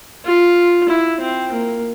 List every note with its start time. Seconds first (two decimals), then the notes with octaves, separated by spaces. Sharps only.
0.25 F4
0.88 E4
1.20 C4
1.52 A#3